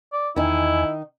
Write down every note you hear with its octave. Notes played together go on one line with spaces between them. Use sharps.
D5
E2 D#3 D#4 E4 G#5